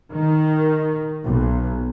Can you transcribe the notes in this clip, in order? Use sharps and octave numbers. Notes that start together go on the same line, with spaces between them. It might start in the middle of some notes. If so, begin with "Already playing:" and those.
D#3
B1